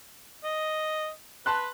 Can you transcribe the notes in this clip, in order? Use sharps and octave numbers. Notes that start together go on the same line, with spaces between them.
D#5
B4 A5 C6 F#6